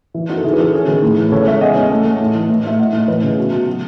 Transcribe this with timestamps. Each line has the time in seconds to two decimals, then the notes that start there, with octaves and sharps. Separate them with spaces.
0.14 E3 E4
0.29 F#2 D#4 F#4
0.37 A4
0.44 C#3 E4 G#4
0.53 B4
0.58 E3 F#4 A4
0.73 C#4 G#4 B4
0.88 D#3
1.02 A2
1.17 E3
1.32 C#3 A4 C#5
1.46 G#3 C#5 E5
1.61 E2 D#5 F#5
1.76 C#4
1.91 A3
2.05 A3
2.20 A2
2.35 E3
2.50 A2
2.64 A2 E5
2.79 A2 D#5 F#5
2.93 A2
3.08 E3 B4 D#5
3.23 C#3
3.38 B2
3.52 B2
3.67 F#3